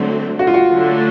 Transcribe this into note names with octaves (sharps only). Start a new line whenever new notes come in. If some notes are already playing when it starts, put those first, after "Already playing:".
Already playing: D3 F#3 A3 C4
F#4
F4
F#4
D3 F#3 A3